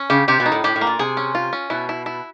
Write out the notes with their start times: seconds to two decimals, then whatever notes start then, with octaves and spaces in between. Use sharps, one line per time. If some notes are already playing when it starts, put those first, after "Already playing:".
Already playing: C#4
0.10 C#3 G4
0.28 C3 G4
0.40 B2
0.46 D#4
0.52 A2
0.64 A2 G4
0.76 A2
0.81 A#3
0.87 A#2
0.99 C3 G#4
1.17 C#4
1.35 F4
1.53 C#4
1.70 B2 E4
1.89 E4
2.06 E4